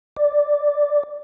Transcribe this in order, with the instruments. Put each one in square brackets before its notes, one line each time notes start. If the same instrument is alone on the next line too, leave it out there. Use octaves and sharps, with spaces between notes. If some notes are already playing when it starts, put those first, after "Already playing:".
[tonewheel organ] D5